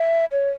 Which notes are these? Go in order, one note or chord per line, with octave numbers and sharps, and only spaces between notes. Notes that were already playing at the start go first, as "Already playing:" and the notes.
Already playing: E5
C#5